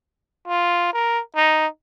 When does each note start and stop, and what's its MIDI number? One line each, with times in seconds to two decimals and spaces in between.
0.48 0.92 65
0.93 1.20 70
1.36 1.67 63